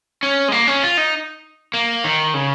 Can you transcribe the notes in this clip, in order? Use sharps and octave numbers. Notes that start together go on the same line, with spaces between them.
C#4
G#3
A#3
C#4
F4
D#4
A#3
D#3
C#3